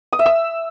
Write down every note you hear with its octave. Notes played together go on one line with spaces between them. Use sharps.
D#6
E5
E6